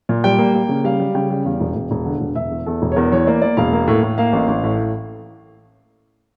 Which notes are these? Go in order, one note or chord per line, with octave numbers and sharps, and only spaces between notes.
A#2
G3 G5
A#3
A#3
C#3
G3 F5
G3
C#3 G5
G3
E2 F5
E1
E1
E1
D3
E1
E1 E5
E2
E2 A4
E1
C#5
E2 A#4
E3 C#5
A#3 D5
A#3 D5
E1 F5
A#3
A2
A2
A#3 F5
A1
A1
A2